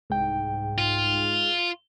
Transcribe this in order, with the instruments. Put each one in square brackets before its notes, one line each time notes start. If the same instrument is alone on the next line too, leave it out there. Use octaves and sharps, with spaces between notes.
[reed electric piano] C2 G5 [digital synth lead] G#2
[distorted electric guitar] F4